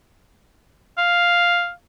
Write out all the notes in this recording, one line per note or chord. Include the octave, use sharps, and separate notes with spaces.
F5